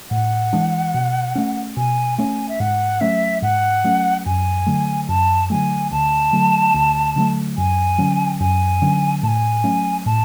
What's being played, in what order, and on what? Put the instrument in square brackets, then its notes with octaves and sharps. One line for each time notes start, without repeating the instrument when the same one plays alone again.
[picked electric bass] A2 [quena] F#5
[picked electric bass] E3 G#3 D4
B2
A3 C#4
[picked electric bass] B2 [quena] G#5
[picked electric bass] A3 C#4 [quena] G#5
[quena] E5
[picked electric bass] G#2 [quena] F#5
[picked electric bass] F#3 A3 C#4 [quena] E5
[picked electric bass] G#2 [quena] F#5
[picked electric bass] F#3 A3 C#4
[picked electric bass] F#2 [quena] G#5
[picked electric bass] D3 F#3 A3
[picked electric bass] F#2 [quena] A5
[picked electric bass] D3 F#3 A3 [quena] G#5
[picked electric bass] D2 [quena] A5
[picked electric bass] D3 F#3 A3
D2
D3 F#3 A3
[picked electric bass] F#2 [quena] G#5
[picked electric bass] D3 F#3 C#4
[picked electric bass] F#2 [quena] G#5
[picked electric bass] D3 F#3 C#4
[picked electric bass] A2 [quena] A5
[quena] G#5
[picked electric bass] F#3 A3 C#4
[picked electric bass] A2 [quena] A5